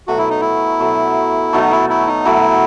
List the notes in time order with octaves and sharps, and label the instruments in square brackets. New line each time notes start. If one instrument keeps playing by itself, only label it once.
[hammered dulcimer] B2 F#3 A3 [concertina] F#4
[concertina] E4
D#4
E4
[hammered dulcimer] B2 F#3 A3
[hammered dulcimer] B2 F#3 A3 [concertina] D#4
[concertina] E4
E4
D#4
[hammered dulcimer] B2 F#3 A3 [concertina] E4